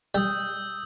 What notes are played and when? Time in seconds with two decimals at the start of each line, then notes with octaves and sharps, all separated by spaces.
0.15 G3 D#6 E6 G6